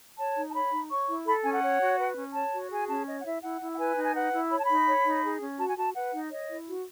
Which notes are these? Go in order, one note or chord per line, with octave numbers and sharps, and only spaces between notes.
C#5 A5
D#4
A5
C#5 B5
D#4
C#5 C#6
E4
A4 B5
C#4 G#5
F#5
C#5
F#4
B4
C#4
C#5 A5
F#4
G#4 G#5
C#4 A5
C#5 D#5
F#5
E4 E5
E4 F#5
E4
F#5
B4 G#5
D#4
G#5
B4 F#5
E4
C#5 B5
A5
D#4 B5
C#5
D#4
G#4
C#4
F#4 A5
G#5
F#4 A5
B4 F#5
D#4
C#5 D#5
E4
F#4